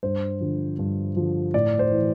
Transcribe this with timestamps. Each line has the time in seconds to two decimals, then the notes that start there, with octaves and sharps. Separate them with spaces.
0.03 G2 C5
0.40 D3 F3
0.79 G2
1.16 D3 F3
1.54 A2 D5
1.79 C5
1.92 E3